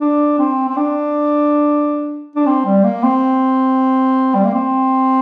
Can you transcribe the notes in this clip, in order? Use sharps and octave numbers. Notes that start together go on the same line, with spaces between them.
D4
C4
C4
D4
D4
C4
G3
A#3
C4
G3
A#3
C4